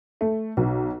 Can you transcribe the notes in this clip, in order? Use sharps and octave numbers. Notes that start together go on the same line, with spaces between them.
A3
B1